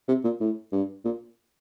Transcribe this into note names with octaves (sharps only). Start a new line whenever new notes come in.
C3
A#2
A2
G2
A#2